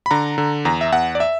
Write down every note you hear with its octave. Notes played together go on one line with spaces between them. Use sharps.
B5
D3 A#5
D3
E2 A#5
E5
E2 F#5
D5
E5